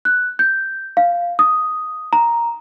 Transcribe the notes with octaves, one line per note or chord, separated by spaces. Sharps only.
F#6
G6
F5
D#6
A#5